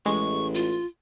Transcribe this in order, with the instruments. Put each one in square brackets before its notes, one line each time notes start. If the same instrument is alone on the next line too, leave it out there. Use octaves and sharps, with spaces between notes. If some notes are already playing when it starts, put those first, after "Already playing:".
[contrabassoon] A1 [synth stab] G#3 [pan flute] C#6
[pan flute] F4